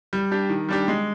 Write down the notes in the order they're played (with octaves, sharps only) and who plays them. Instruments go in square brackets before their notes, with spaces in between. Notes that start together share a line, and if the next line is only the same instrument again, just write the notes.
[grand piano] G3
D4 G4
D#3
G3 D4 G4
G#3